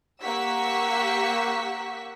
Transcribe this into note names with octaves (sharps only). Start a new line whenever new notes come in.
A#3 G4 F#5 C#6 E6 B6